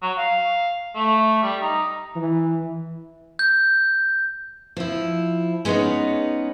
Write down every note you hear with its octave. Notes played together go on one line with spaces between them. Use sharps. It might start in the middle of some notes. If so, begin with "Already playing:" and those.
F#3
F5
A3
G3
D#4
E3
G6
F3 E4
G#3 B3 C#4 D#4 C#5